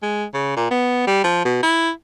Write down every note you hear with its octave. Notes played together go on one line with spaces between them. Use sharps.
G#3
C#3
A#2
B3
G3
F3
B2
E4